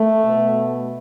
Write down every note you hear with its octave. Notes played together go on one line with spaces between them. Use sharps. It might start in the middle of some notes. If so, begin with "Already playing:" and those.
Already playing: A3
B2